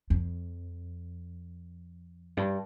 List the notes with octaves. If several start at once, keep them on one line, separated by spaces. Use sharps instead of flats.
F2
G2